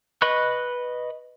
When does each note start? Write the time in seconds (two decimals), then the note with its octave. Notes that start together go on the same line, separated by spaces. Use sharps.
0.22 B4 D#5 B5 C#6 F#6